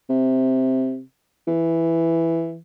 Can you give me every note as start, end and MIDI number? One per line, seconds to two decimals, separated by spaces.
0.09 1.00 48
1.47 2.58 52